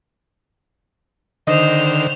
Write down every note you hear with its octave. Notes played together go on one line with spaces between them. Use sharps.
D3 D#3 C5 D#5 F7